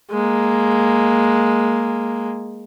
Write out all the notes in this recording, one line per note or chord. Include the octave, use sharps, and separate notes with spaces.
G#3 A#3